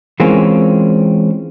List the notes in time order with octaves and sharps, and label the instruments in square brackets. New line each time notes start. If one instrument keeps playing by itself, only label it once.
[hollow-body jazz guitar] E3 G#3 A#3 C4 C#4 F4